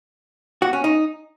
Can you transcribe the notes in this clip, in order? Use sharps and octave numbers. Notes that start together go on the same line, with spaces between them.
F#4
C#4
D#4